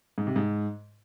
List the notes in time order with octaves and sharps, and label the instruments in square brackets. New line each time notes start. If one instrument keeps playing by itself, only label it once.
[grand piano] G#2
C3
G#2